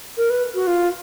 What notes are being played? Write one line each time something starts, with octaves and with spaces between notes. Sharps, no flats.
A#4
B4
F#4
F4